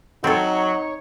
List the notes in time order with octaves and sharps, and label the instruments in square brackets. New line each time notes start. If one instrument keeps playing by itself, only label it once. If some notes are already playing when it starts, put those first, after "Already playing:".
[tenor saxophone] F#3 [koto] C4 A4 [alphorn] D#4 [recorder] C#5